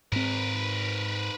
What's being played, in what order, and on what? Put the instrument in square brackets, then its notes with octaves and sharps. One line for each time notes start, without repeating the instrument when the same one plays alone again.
[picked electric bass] G#2 C4 [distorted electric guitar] A#4 B4